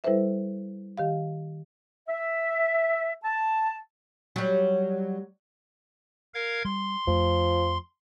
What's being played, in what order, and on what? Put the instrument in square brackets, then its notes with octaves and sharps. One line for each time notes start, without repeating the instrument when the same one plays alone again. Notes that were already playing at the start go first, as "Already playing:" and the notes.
[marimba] G3 E4 A4 B4 C5 E5
D#3 G4 F5
[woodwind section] E5
A5
[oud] F#3 G3
[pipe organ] A#4 F5 G#6
[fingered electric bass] G3 [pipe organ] C6
[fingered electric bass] F2 A3 [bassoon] F3